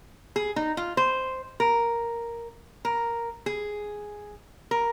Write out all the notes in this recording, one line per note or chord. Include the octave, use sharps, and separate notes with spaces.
G#4
D#4
F4
C5
A#4
A#4
G#4
A#4